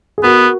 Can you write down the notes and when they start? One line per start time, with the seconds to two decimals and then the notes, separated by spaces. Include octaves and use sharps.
0.18 G#4
0.23 B3 F#4 A#4